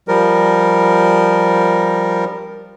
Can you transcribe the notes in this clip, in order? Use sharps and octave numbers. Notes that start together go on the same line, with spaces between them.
F3 G3 A#4